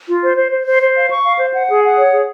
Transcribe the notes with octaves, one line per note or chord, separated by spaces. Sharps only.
F4
C5
C5
C5
C5
C5
F5
C#6
F5
C5
F#5
G#4
F#5
C#5
G#4